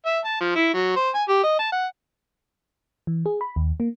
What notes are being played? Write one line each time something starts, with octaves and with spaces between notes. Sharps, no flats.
E5
A5
F3
E4
F#3
C5
G#5
G4
D#5
A5
F#5
E3
G#4
B5
D#2
A#3